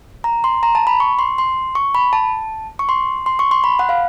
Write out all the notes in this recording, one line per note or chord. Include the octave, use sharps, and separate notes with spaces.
A#5
C6
A#5
A5
B5
C#6
C6
C6
C#6
B5
A5
C#6
C6
C6
C#6
C6
B5
F#5
F5